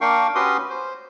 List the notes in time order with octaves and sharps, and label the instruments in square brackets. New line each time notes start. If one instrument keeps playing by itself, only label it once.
[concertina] A#3 D4 A#4 F5 G5 C#6
C#4 F#4 G4 B4 C6 D#6
C5